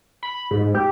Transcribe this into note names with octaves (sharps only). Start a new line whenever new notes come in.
B5
G#2
G4